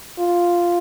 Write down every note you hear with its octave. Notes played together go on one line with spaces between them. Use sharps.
F4